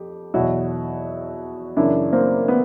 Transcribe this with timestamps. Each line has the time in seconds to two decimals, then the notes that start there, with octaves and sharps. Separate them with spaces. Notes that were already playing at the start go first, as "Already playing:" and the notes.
Already playing: F2 G4
0.34 E2 B2 F#3 E4 F#4
1.77 F#2 C#3 E3 D4 E4
2.12 A#3 C4
2.48 B3